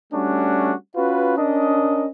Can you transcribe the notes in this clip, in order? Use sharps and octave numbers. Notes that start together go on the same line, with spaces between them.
G3 A3 C#4 D4 F#4
C#4 F4 F#4 B4
C#4 D4 A#4 D#5